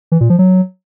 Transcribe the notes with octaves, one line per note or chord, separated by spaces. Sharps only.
E3
A#2
F3
F#3